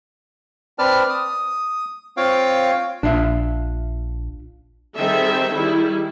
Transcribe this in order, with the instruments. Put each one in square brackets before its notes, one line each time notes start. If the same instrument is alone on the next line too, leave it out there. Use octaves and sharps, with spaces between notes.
[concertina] C4 B4 D5 A5 F6
D#6
C4 F4 C#5 F5 G5
[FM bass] A#1 [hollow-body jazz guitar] D4 F4 E5
[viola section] D#3 G3 C4 G#4 A4 E5
D#3 G3 E4 G#4